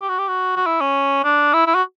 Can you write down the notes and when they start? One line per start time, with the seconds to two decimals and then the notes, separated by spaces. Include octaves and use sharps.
0.01 G4
0.09 F#4
0.18 G4
0.28 F#4
0.56 F#4
0.66 E4
0.81 C#4
1.24 D4
1.54 E4
1.67 E4
1.75 F#4